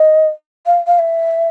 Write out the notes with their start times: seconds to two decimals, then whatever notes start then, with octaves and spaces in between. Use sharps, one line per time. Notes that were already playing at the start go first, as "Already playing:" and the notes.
Already playing: D#5
0.66 F5
0.87 F5
0.99 E5